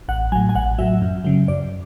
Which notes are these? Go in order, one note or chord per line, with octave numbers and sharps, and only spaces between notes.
A1 F#5
A2 F#3 G#5
G#5
A1 F#5
A2 F#3 E5
F#2
C#3 F#3
F#2 D5